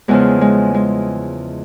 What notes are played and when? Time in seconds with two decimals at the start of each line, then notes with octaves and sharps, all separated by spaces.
0.08 E2 C#3 F3 G#3
0.41 G#3
0.74 G#3